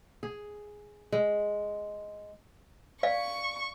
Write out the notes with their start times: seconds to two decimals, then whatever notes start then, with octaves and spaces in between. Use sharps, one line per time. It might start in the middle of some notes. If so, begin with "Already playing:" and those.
0.23 G#4
1.12 G#3
3.03 D5 F5 C#6